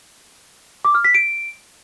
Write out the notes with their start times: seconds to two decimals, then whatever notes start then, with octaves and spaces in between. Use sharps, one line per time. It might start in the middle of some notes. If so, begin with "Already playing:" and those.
0.85 D6
0.95 F6
1.05 B6
1.14 D7